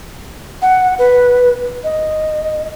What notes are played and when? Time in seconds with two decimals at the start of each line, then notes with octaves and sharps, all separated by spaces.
0.62 F#5
0.99 B4
1.84 D#5